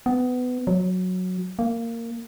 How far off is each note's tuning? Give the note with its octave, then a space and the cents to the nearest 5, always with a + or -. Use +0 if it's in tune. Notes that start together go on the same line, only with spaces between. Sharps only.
B3 +20
F#3 -10
A#3 -15